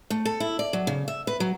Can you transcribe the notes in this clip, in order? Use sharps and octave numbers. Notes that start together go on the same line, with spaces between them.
A3
A4
E4
D5
F#3
C#3
E5
B4
F#3